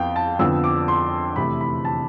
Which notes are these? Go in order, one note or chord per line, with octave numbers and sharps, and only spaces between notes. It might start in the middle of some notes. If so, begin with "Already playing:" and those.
Already playing: F2 B3 F5 G5
A5
F2 D3 F3 B3 E6
D6
C6
E2 C3 E3 A3 B5
B5
A5